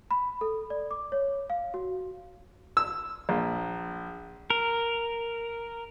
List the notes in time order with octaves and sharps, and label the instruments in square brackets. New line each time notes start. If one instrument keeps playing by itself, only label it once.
[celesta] B5
A4
D5
D6
C#5
F5
F#4
[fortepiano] E6
A#1
[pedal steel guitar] A#4